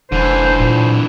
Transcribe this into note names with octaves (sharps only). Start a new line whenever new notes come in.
F1 D3 E3 C5
A#2